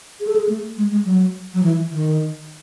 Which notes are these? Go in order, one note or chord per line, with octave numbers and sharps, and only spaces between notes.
G#4
A4
G#4
A3
G#3
G#3
F#3
F#3
E3
D#3